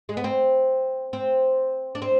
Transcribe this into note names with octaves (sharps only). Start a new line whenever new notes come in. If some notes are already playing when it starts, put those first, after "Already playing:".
G#3
B3
C4
C4
D4
C4